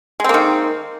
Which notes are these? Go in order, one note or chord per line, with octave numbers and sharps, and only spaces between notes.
D#3 G#3 A#3 C4